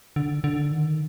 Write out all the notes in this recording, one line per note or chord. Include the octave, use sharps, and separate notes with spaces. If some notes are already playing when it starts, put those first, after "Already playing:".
D3
D3
D#3